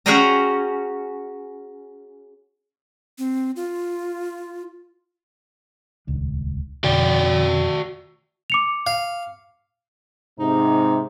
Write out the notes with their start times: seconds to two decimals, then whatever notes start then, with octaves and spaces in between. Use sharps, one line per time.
0.06 C#4 F#4 G#4 G5 G#5 A#5
3.18 C4
3.56 F4
6.07 D#1 C#2 D4
6.84 F2 B2 D3 F#4 D5 G5
8.50 D6 C#7 F7
8.87 F5
10.39 G#2 C3 D#4